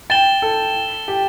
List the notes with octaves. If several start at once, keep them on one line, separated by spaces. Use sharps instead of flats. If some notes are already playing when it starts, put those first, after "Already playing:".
G5 A6 E7 G7
A4
G4